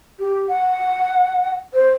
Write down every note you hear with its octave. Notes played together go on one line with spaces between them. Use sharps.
G4
F#5
C5